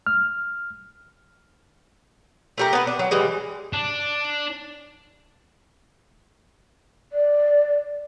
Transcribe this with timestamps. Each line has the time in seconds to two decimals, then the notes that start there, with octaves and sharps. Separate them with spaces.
0.07 F6
2.58 A3 G4 A#4
2.73 B3 B4
2.87 D4
2.99 F#3
3.11 E3 G3 G#3
3.73 D4
7.12 D5